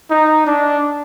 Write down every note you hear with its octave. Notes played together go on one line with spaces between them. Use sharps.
D#4
D4